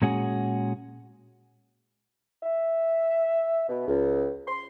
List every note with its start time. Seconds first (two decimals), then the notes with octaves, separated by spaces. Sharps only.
0.02 A#2 G#3 C#4 F#4 G#4
2.43 E5
3.69 B2
3.87 C#2
4.48 C6